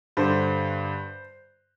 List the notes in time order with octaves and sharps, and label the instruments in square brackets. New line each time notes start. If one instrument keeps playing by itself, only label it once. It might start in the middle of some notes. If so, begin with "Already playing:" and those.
[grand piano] G2 D3 C5